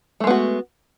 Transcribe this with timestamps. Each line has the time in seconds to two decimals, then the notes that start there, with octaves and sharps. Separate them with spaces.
0.20 A3
0.24 G#3
0.27 B3
0.30 F#4